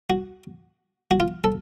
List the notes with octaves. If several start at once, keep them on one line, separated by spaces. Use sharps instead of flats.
F#4
F#4
F4
A4